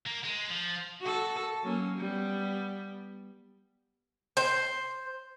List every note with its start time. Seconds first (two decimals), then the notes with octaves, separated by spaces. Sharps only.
0.07 A#3
0.24 G#3
0.49 F3
1.00 F#4 A4
1.63 F#3 A#3 C#4
1.97 G3 B3
4.37 C5